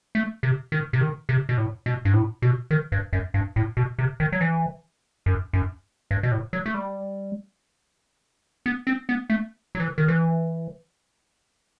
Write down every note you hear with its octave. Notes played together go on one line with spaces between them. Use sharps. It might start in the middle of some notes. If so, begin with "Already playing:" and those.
A3
C3
D#3
C3
D#3
C3
B2
A2
B2
G2
A2
B2
D#3
G2
F#2
G2
A2
B2
C3
D#3
F#3
E3
F#2
F#2
G2
B2
A2
F#3
A3
G3
B3
C4
B3
A3
F#3
E3
D#3
E3